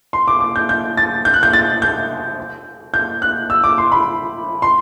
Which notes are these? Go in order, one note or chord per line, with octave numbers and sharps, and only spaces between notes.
C6
D6
D6
G6
G6
A6
G6
F#6
G6
A6
G6
G6
F#6
E6
D6
C6
B5
C6